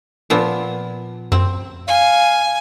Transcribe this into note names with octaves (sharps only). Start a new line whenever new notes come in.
A#2 F3 B3
F#2 C4
F5 G#5